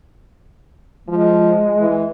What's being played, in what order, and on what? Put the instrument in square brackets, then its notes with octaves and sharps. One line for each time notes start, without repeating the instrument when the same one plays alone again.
[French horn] F3 [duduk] G#3
[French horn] E3